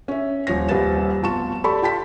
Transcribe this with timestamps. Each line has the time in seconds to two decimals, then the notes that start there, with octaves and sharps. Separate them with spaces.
0.08 C#4 E5
0.47 D#1 F3 C#5 A#6
0.69 D#1 C2 G3 B4 A6 E7
1.22 F1 B2 F4 A5 C#6 E7
1.64 G4 A4 D5 A5 B5 C#6
1.82 F4 G5 A5 B6